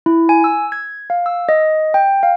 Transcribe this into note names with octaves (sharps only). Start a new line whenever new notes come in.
E4
G#5
E6
G#6
F5
E6
D#5
G5
F5